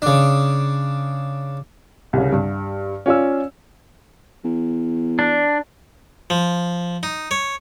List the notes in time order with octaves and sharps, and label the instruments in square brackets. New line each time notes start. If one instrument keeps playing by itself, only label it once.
[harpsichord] C#3 D4
[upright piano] C2 C#3
G2
C#4 F4 D5 E6
[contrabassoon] E2
[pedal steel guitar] D4
[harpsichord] F3
D#4
C#5